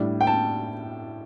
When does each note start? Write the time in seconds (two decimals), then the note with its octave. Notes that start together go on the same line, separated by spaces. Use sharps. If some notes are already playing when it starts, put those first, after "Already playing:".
Already playing: A2 G3 D4
0.21 G5
0.27 A5